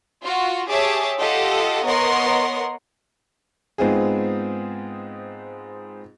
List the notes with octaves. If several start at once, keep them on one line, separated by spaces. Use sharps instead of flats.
F4 F#4
G4 G#4 C#5 E5 A5 D6
F4 G4 A4 D#5 F#5
B3 A#4 C#5 D#5 F#5 C6
G#2 B3 C4 D#4 F4 G#4